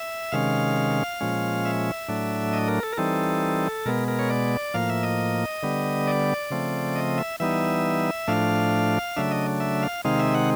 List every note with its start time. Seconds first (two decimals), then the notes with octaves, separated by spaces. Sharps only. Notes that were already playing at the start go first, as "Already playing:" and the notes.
Already playing: E5
0.32 C3 D#3 G#3 C#4 F5
1.21 A#2 F3 G#3 C#4
1.65 E5
2.08 A2 F#3 A3 D4
2.53 D#5
2.68 A#4
2.83 A4
2.93 A#4
2.97 E3 G3 C4 D#4 A4
3.86 B2 G#3 B3 A#4
4.08 A#4
4.19 C#5
4.30 D5
4.74 A2 F3 A#3 F5
4.89 E5
5.03 D#5
5.63 D3 G3 B3
6.07 D5
6.50 C#3 F3 A3 C4
6.96 D#5
7.18 E5
7.40 E3 G3 B3 D#4 E5
8.28 A2 F3 A3 D4 F5
9.16 C#3 F#3 A3 D4 E5
9.31 D#5
9.60 E5
9.83 F5
10.05 C3 D#3 G#3 C4 D#4 F5
10.19 E5
10.34 F#5